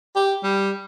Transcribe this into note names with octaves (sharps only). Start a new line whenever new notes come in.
G4
G3